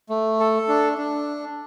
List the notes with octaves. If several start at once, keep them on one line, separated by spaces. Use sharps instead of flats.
A3
A4
D4
D4